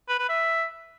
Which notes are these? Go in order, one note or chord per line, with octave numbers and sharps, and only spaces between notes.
B4
B4
E5